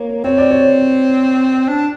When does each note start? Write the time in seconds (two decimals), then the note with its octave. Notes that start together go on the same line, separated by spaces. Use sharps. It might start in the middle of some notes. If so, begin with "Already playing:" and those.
Already playing: A#3 C#5
0.24 C4 C#5
0.38 D5
0.51 C#5
1.68 D4